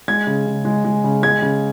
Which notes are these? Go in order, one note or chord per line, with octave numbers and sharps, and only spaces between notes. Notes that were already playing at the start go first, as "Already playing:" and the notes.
G#3 G#6
C#3
C#3
G#3
G#3
C#3
G#3 G#6
C#3